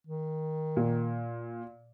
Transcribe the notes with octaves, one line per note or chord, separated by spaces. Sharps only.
D#3
A#2